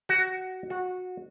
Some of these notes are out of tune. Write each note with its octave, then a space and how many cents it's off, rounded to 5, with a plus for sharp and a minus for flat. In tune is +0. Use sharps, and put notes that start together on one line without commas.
F#4 +10
F#4 -20